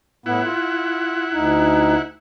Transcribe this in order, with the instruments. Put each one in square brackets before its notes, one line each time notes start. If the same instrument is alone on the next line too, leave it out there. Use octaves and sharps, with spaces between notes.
[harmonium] A2 B3 [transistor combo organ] E4 F#5
[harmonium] F4
D2 D#4